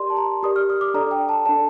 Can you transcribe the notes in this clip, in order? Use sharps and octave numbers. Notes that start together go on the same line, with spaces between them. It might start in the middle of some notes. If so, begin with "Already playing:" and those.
Already playing: G4 A#4 D5 C6
A5
A#5
G4 A#4 D5 D#6
F6
D#6
D6
D4 A4 D5 A#5
G5
A5
D4 A4 D5 A5